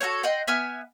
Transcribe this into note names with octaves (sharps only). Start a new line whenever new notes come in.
F#4 A4 C5 C#5
D#5 F#5 G5 C6
B3 E5 G#5 F6